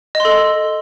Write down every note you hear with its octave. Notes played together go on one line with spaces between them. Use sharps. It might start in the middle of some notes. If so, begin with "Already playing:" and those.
D#5
C6
A4